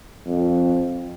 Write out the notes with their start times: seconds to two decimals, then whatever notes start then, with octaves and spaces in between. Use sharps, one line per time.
0.26 F2